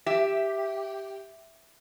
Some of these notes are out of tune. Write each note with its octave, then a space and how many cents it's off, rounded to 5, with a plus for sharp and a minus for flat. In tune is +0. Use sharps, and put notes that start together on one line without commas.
G4 +0 E5 +0